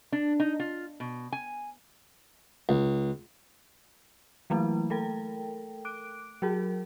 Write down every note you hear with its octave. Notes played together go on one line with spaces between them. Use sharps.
D4
D#4
F4
B2
G#5
C#2
E3 F#3 A3 A#3 E4
A3 A4 A#4 G5
D6 F#6 D7
F#3 F#4 G#4 A#4